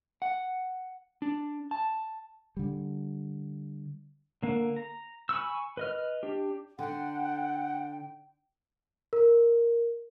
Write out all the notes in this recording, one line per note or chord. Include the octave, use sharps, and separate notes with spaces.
F#5
D4
A5
D3 G3
D3 A#3
A#5
G#5 B5 C#6 E6
B4 D#5 F6
D4 G4
D3 D4 F#5 G5
A#4